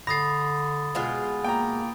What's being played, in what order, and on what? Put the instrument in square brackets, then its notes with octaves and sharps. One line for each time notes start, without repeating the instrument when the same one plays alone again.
[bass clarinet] D3 [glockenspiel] B5 D#6 A6 [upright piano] A#6 C7
[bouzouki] B2 G#3 F4
[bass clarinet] A#3 [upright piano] G5 A#5